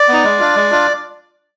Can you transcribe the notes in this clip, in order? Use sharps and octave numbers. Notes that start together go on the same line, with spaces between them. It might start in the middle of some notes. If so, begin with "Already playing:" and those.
Already playing: D5
B3 D#4
G#3
D4 F4
G#3
D4 F4